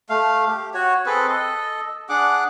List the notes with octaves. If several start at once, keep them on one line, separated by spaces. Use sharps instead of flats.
A3 F5
G4
F#4 C#5
C4 G#4 A4 B4
A4 D#5
D4 G#4 F#5 D6